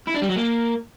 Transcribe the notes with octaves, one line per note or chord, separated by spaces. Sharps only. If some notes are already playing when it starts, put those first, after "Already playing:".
E4
D4
G3
F#3
A#3